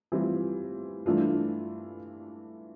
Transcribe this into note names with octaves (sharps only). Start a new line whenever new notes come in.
E3 G3 C4 F4
G2 E3 A3 D4 F4